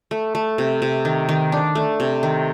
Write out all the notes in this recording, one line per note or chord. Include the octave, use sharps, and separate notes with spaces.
A3
A3
C3
C3
D#3
D#3
D4
A3
C3
D#3